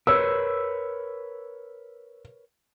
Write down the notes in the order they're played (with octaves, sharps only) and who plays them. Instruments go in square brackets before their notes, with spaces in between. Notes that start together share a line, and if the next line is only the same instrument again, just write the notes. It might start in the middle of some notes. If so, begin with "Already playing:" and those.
[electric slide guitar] A#4 B4 C#5 [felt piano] E6